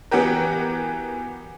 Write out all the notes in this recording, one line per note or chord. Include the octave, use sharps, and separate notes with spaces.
E3 B3 F#4 G4 A#4